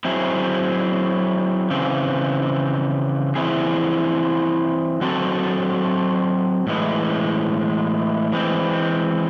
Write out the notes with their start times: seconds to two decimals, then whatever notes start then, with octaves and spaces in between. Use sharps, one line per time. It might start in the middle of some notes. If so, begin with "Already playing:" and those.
0.05 F#3 C4 E4 G#4
1.70 C#3 E3 C4
3.36 E3 C4 E4 G#4
5.01 F#3 C4 F#4 A4
6.67 A2 E3 G#3
8.33 E3 G#3 C4